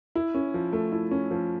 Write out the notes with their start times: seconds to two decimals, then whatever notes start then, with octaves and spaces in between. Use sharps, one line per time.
0.15 E4
0.35 C#4
0.54 F3
0.73 A3
0.92 E4
1.11 C#4
1.31 F3